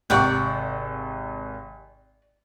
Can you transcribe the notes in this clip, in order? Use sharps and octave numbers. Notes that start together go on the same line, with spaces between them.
G#1 C3 D5 F#5 G5 C#6